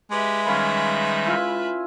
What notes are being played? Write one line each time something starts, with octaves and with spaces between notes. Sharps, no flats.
G#3 G4 B4 E5
D#3 G3 C#4 D#4 F5 B5
E4 F4 G#5